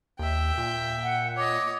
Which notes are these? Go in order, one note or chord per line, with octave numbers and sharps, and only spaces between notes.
D#2 E5 G5
A#2
F#5
C#5 D#5 D6